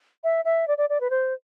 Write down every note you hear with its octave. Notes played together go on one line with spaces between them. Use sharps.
E5
E5
D5
D5
D5
B4
C5